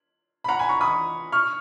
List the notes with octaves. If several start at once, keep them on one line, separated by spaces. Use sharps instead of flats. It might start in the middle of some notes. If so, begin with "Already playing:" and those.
B5
F#5 A#5
G#5 B5
A#5 C#6
B5 D#6
C#6 F6